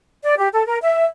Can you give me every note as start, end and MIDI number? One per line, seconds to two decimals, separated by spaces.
0.23 0.33 74
0.38 0.48 67
0.53 0.65 69
0.66 0.77 70
0.82 1.05 76